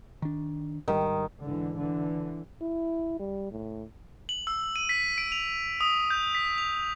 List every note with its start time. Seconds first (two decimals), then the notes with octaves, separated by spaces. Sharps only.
0.22 D#3 D4
0.88 G#1 D#3 G3
1.41 G#2 D3 E3
1.77 D3 E3
2.61 E4
3.19 G3
3.51 A2
4.29 F#7
4.47 E6
4.76 D#7
4.89 B6
5.18 D7
5.32 F7
5.81 D#6
6.10 G6
6.35 B6
6.58 F7